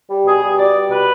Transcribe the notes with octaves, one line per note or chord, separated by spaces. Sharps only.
G3
B2 G#4
G3
B2 D5
G3
B2 B4